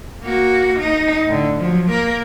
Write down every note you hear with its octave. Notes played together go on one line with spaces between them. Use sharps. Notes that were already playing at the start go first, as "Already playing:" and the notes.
A#3 F#4
D#4
A2 D3
F3 F#3
A#3 A#4